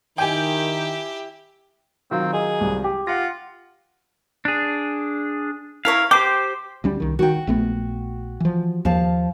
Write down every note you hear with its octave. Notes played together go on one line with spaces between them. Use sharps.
D#3 E4 G4 G5 G#5
D#3 F#3 C4 F4
G#4 D#5
C2
G4
F4 F#5 A#6
D4 G#4
E4 A#4 C#5 F5
G4 C5 G5 D6
D2 G3 C#4
C2 D#3
D#3 F#4 G5
A#1 A3 B3
E3 F3
D#2 F3 F5 A5